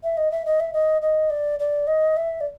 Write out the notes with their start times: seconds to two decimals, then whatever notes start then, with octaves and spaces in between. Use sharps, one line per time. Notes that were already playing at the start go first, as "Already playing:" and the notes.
0.03 E5
0.17 D#5
0.31 E5
0.45 D#5
0.60 E5
0.73 D#5
1.01 D#5
1.30 D5
1.59 D5
1.87 D#5
2.17 E5
2.40 D5